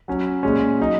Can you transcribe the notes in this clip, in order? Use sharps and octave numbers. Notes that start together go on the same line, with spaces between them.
F#3 C#4
A#2 G#3 C#4
F#3 D#4